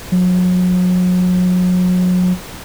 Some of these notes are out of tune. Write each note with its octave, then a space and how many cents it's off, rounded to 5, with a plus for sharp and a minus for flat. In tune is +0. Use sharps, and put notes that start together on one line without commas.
F#3 -35